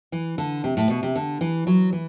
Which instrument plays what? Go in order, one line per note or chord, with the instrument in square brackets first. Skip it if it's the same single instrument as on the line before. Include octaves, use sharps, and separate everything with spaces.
[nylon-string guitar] E3
D3
C3
A2
B2
C3
D3
E3
F#3
E3